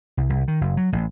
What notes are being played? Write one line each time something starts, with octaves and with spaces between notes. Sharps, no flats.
C2
C2
D#3
F#1
F#3
A1